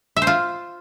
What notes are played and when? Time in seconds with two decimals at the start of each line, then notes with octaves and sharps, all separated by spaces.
0.17 E5
0.22 C5
0.27 F4